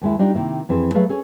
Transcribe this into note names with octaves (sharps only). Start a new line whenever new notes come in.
D#2 G#3 E4
G3 D4 D#4 F4 G4
C3 D#3 A#3 E4
F2 E3 C4 G#4
F#3 A3 G#4 B4 F5
C#4 G#4 A4